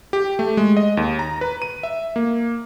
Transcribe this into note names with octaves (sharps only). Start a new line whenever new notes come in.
G4
A3
G#3
D#5
D#2
A#5
B4
D#7
E5
A#3